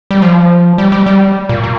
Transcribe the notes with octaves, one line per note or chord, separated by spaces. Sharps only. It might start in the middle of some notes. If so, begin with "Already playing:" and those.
G3
F3
G3
G3
G3
A#2
A#2